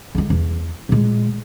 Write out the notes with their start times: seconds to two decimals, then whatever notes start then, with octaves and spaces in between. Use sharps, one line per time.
0.15 D3 G#3
0.30 E2
0.89 A#2 G#3